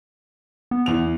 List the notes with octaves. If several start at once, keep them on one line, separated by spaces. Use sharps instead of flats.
B3
E2 F7